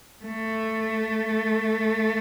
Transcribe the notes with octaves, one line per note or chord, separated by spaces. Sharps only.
A3